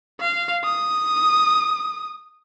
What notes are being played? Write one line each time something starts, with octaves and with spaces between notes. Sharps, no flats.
F5
D#6